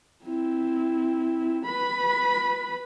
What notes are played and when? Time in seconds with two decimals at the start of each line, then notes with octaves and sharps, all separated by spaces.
0.25 C4 E4
1.65 B4 B5